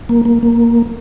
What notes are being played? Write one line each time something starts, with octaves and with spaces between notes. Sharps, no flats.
A#3
A#3
A#3